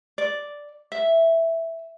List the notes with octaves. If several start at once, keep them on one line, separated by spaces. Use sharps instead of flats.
D5
E5